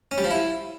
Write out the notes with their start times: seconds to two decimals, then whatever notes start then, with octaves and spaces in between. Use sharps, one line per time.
0.11 C#4
0.18 G3
0.24 F3
0.31 E4